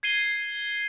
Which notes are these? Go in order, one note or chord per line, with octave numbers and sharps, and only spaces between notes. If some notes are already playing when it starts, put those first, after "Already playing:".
G#6 C7 D#7 G7